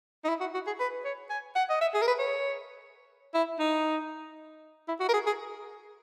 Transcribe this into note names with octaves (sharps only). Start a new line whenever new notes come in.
D#4
E4
F#4
F#4
G#4
B4
C#5
G#5
F#5
D#5
E5
G#4
A#4
B4
C#5
E4
D#4
E4
F#4
A#4
G#4
G#4